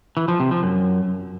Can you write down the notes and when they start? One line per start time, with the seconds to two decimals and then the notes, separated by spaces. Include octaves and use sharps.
0.17 E3
0.28 F3
0.40 C3
0.51 F3
0.63 F#2